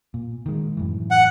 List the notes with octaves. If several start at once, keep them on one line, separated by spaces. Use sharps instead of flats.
A#2
D#3 G#3
F#2 A2 E3
F#5